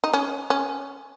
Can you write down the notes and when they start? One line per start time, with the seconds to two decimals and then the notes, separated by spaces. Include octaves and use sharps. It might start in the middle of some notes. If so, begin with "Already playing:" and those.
0.04 D#4
0.14 C#4
0.50 C#4